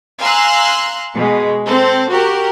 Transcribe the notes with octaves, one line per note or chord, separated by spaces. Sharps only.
F5 G#5 A#5 C6 E6 F#6
B2 G#3
C4 A4 C5
F#4 G4 A#4